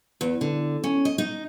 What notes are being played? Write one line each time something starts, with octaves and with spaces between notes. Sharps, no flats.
E2
D3
C#4
D#5
D#4